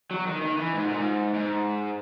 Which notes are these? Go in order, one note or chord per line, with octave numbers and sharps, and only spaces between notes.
F#3
D#3
D#3
E3
G#2
A#2
G#2
G#2